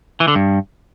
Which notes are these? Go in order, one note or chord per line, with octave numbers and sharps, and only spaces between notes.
E3
D3
G2